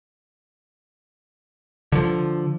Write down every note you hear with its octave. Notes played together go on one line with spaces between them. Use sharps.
D3 E3 F3